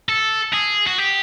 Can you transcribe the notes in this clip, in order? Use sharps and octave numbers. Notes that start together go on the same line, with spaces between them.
A4
G#4
F#4
G4